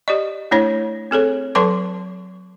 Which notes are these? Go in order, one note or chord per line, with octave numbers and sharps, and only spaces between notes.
G4 D5 D#5
A3 D4 E4 C#5
C4 G#4 A4 C#5
F#3 A4 B4 A5 C6 D6